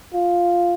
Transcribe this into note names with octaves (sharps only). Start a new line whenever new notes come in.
F4